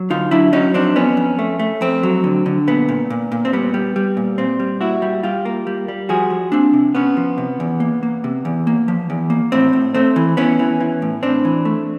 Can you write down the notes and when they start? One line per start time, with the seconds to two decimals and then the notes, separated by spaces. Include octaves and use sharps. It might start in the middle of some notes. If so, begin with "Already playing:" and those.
Already playing: F#3
0.10 D3 D#4 F4
0.31 F#3 D4 E4
0.53 F#3 C#4 D#4
0.74 F2 C4 D4
0.95 F2 B3 C#4
1.17 F2
1.39 A3
1.59 A3
1.81 F2 C4
2.03 F#3
2.24 D3
2.46 D3
2.67 A#2 B3
2.88 A#2
3.10 A#2
3.32 A#2
3.45 C4
3.53 G3 B3
3.74 G3
3.96 G3
4.17 A#2
4.38 A#2 C4
4.60 G3
4.81 A#2 E4 F#4
5.02 G3
5.23 G3 F4 G4
5.45 A#3
5.67 G3
5.88 G3
6.09 F3 F#4 G#4
6.30 F3
6.52 A#3 C4 D4
6.73 C3
6.95 C3 B3 C#4
7.17 F3
7.38 C3
7.60 E2
7.80 A#3
8.03 A#3
8.24 C3
8.45 E2
8.67 A#3
8.88 F3
9.10 E2
9.30 A#3
9.52 A2 C4
9.73 A2
9.94 A3 C4
10.16 E3
10.37 E3 B3 C#4
10.59 E3
10.80 E3
11.02 A2
11.23 A2 C4 D4
11.45 E3
11.65 A3